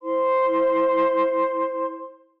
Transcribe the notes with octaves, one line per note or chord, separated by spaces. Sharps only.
E4 C5 C6